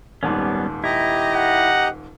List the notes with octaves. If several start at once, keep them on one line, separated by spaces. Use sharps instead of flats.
D#1 G#2 G3 B3 C#4
E4 G4 D#5 A#5
F#5